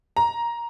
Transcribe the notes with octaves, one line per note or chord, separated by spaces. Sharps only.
A#5